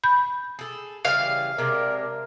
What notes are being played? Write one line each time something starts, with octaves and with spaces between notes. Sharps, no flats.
B5 G6
G#4 A4
C#3 E3 G3 F5
C3 G#3 D4 A#4